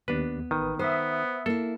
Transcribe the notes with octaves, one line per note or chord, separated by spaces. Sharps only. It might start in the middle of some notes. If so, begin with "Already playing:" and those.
D#2 B3 D4 B4
A1 D#3 B4 D#6
B3 C5 E5 D#6
A#3 E4 A4